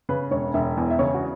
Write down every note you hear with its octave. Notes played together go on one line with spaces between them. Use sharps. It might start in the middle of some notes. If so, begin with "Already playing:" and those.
C#3 B4
E1 C#5
E1 E5
E2
E5
C#3 C#5
F#4